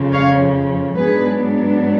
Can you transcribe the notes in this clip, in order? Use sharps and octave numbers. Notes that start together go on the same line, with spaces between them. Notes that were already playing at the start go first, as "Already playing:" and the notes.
Already playing: F2 C#3 F3
C#5 F5
G#2 F#3 B3 D4 G#4 B4